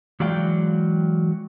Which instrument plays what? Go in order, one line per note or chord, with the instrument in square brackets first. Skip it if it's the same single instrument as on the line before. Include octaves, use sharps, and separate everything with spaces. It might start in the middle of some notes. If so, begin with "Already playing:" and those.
[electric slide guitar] E3 F#3 G#3 D5 F5 G5